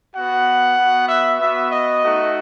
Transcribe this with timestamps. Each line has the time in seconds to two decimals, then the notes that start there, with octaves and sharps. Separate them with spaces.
0.14 B3 F#4 F#5
0.77 B3 F#4
1.09 E5
1.40 B3 F#4 E5
1.71 D#5
2.02 A3 D#4 F#4